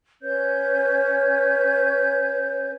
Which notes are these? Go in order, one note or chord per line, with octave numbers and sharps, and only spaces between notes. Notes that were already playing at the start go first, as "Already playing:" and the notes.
C#4 B4 C#5 G6